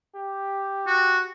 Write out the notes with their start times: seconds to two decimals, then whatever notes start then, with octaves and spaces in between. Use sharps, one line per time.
0.15 G4
0.86 F#4